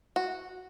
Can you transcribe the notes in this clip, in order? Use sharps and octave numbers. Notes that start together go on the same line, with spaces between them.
F#4